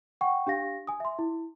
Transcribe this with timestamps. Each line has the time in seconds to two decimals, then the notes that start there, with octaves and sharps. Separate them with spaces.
0.21 F#5 G5 C#6
0.47 D4 G4 F5 A#6
0.87 G#5 D#6
1.00 E5 C6
1.19 E4